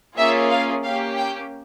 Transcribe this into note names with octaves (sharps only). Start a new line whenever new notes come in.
A#3 C#4 F4 G#4 E5
F5
A#3 C#4 G4 F5
G5